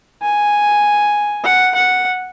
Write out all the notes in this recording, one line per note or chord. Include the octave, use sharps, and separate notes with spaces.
G#5
F#5
F#5